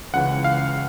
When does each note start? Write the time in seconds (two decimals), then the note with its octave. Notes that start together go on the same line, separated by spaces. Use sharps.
0.14 C#2 C#3 E3 F#5
0.44 F5